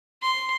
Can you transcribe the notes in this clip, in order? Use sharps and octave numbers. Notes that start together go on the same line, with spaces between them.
C6